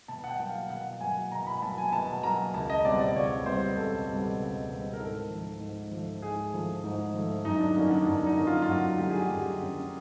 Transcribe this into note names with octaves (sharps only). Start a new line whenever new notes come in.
B2 A5
F#5
G5
F#3 A#3
F5
B2 F#5
F#3 A#3 G#5
B2 A#5
B5
F#3 A#3 A5
G#5
B2 A5
F#3 A#3 A#5
C#2 A5
D#5
B2 G3 C4 D5
D5
C#2 C#5
B2 G3 C4 C5
C#2 A4
B2 G3 C4
C#2
B2 G3 C4
A#4
G#2 A4
F3 A3
G#2
F3 A3
G#2 G#4
F3 A3
G#2
F3 A3
F#2 D#4
D4
D3 F#3 A#3 C#4 D#4
D4
F#2 D4
D#4
D3 F#3 A#3 C#4
F4
F4
F#2 F#4
D3 F#3 A#3 C#4 G4
G#4
G4
F#2
D3 F#3 A#3 C#4